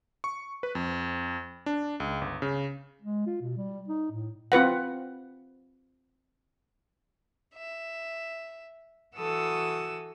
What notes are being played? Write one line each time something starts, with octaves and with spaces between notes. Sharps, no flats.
C#6
B4
F2
D4
C#2
G1
C#3
G#3
F4
B2
G3
D#4
A2
C4 F4 B4 F#5
E5
E3 F#4 A4 D#6 E6